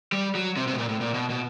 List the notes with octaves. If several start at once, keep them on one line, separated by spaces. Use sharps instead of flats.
G3
F#3
C3
C3
A2
A#2
A2
A#2
B2
B2